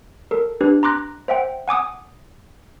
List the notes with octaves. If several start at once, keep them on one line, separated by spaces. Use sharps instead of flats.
A4 A#4
D4 G4 B4
A#5 C6 D6 F#6 A#6
C5 E5 F#5 G5
F#5 G#5 D6 D#6